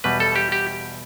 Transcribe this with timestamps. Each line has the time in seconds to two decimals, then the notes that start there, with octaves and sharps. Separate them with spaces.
0.04 E2 B2 G3 B4
0.20 A4
0.36 G4
0.52 G4